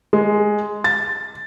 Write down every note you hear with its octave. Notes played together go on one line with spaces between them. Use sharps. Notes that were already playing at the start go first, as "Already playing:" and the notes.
G#3
A6